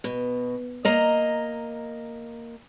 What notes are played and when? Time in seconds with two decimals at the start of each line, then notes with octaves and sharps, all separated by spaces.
0.04 B2
0.85 A#3 D#5 A#5